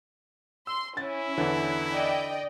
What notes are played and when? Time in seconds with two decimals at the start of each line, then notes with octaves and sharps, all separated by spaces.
0.67 C6 E6
0.97 C#4 E4 A6
1.38 E2 D3 E3
1.93 D5 D#5 G5